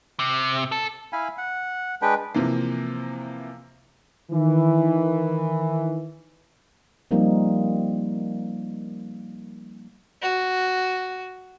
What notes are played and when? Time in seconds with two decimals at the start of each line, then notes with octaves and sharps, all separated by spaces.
0.19 C3
0.72 A4
1.13 E4 F5 G#5 B5
1.38 F#5
2.02 G#3 D4 B4 G5
2.35 C3 E3 F3 A#3
4.31 D#3 E3
7.11 F3 G3 A#3 C4 D#4
10.22 F#4